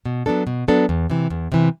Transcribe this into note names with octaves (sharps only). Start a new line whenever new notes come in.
B2
F#3 B3 D4 A4
B2
F#3 B3 D4 A4
E2
C3 E3
E2
C3 E3